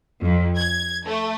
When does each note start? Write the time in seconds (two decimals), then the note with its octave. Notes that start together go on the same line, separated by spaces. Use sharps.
0.22 F2
0.57 G#6
1.05 A3